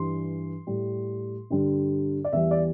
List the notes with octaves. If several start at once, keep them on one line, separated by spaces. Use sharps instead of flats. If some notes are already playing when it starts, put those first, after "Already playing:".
Already playing: G2 E3 G3 C6
A2 G3
G2 D3 G3
D5
E2 E3 G3 E5
D5